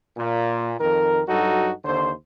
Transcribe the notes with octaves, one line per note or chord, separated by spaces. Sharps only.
A#2
F2 D#3 A#4
G2 F#3 D#4 F#4 A4
D#2 D3 C5